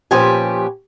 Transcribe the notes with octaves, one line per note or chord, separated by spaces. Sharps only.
A#2 F3 C#4 G4 B4 G#5